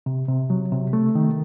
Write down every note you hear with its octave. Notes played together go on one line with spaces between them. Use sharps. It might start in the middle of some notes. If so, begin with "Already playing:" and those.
C3
C3
F#3
C3
A3
D#3